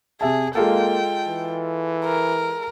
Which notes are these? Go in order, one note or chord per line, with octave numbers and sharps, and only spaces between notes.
C3 G#4 E5 A5
G#3 A#3 F4 A4 G5
E3
A#4